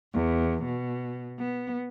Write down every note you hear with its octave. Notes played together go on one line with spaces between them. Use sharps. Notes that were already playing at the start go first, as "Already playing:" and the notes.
E2
B2
B3